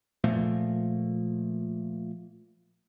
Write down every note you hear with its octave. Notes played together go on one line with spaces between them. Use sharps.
A#2 F3 A3 A#3